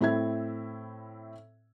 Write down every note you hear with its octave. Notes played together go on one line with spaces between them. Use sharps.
A2 C4 E4 E5 G#6